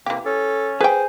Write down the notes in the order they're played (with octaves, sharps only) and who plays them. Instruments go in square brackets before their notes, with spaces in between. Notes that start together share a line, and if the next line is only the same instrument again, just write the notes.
[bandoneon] C3 A#3 [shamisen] E3 G4
[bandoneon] C#4 [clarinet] A4
[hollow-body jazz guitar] G#4 [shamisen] B4 G5 [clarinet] C5